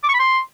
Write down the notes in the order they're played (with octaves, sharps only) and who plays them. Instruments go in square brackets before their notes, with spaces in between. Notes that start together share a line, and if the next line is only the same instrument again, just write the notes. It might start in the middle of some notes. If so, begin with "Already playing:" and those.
[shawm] D6
C#6
B5
C6